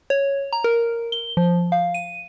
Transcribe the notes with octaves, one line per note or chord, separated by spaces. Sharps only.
C#5
A#5
A#4
G7
F3
F5
D#7